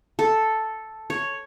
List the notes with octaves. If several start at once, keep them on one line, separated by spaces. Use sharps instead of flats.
A4
C#5